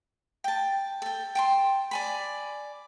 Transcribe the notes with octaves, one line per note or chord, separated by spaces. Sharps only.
G5 A5
A4 G5
G5 A5 C6
D5 G#5 B5